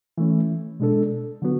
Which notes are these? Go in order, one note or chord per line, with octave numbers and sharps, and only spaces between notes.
E3 A3 C#4
B2 G#3 D4 A4
D3 F#3 B3 F#4